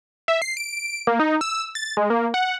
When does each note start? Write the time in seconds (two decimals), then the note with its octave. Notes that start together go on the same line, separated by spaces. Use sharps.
0.28 E5
0.42 C7
0.57 D7
1.07 A#3
1.20 D#4
1.41 E6
1.75 A6
1.97 G#3
2.10 A#3
2.34 F#5